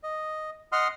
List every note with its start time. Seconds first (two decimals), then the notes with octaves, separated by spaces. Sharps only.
0.03 D#5
0.72 D#5 F#5 C6 D#6 F6